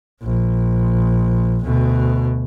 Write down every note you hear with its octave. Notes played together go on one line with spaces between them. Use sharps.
A#1
D2 B2